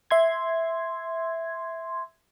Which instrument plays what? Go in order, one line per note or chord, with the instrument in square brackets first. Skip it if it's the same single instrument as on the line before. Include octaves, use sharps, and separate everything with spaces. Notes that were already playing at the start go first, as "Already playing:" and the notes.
[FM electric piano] E5 C6 G#6